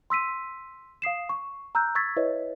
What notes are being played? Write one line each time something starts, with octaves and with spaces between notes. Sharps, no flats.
C6 E6 B6 D#7
F5 D#6 C7 E7
C#6
A#5 E6 F#6 G6
C#6 E6 G#6 A6 B6
E4 B4 C#5 D#5 E5